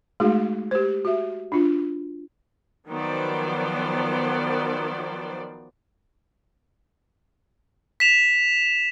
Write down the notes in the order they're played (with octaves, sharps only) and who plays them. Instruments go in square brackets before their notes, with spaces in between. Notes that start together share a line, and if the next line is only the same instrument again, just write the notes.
[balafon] G#3 A3 D#4 F#4 G#4
G4 C5
F#4 E5
D4 F4
[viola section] D#3 F3 F#3 B3 C5 D5
[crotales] B6 E7 F7